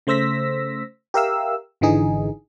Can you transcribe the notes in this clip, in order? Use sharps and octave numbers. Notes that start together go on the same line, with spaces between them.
C#3 A3 C5 E6 A#6 B6
G4 A#4 E5 F5 E6
G#1 D3 E3 D#4 G#4